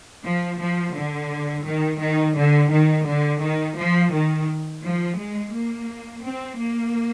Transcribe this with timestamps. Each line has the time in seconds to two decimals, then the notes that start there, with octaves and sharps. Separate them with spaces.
0.24 F3
0.59 F3
0.95 D3
1.65 D#3
2.01 D#3
2.36 D3
2.71 D#3
3.07 D3
3.42 D#3
3.77 F3
4.13 D#3
4.83 F3
5.18 G#3
5.53 A#3
6.24 C4
6.59 A#3